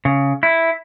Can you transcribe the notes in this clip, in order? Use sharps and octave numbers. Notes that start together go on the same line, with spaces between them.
C#3
E4